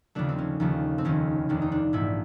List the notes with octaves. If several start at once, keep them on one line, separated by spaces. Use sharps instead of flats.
D#2 C#3 F3 A3 D4
C4
C#4
D#2 C#3 F3 A3
C4
F1 D#2 D#3 C#4
F1 D#2 D#3 D4
D#4
D4
A#1 G#2 E3 A3 E4